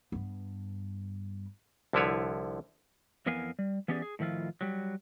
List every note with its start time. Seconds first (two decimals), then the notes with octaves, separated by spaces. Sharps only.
0.12 G2 B3
1.93 C2 D3 F3 E4 B4 C#5
3.26 F2 E3 B3 A#4 F5 G#5
3.59 G3
3.88 E3 B3 C#4 G4 G#4 D5
4.02 G#4
4.19 A2 D#3 F3 E4 F4
4.61 F#3 G3